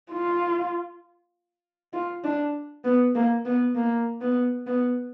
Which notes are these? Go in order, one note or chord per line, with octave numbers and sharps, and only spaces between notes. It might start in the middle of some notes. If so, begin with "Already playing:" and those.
F4
F4
D4
B3
A#3
B3
A#3
B3
B3